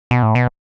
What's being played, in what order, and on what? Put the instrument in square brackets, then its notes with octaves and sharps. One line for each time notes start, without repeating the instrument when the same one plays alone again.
[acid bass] B2
A2
B2